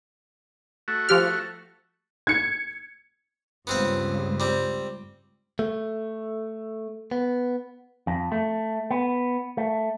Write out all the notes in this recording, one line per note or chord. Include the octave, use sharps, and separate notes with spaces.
A3 F#4
F3 G4 F6
G#6 C#7
C#2 G2 B3 C4 F5
G3 C4
A3
B3
F2
A3
B3
A3